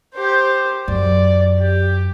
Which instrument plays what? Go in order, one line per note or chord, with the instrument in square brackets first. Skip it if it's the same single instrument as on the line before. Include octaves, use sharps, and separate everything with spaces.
[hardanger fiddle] G4 C5
[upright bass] F#2 [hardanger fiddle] D5
[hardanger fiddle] G4